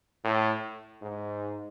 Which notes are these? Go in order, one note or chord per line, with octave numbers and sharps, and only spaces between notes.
A2
G#2